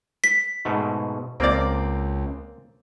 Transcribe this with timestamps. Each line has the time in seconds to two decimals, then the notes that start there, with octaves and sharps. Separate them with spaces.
0.24 B6
0.65 G#2 B2 A3
1.40 C#2 A#3 C4 A#4 D5